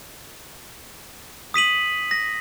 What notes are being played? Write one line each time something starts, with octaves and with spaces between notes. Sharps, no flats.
D#6 B6 D#7 F#7
A#6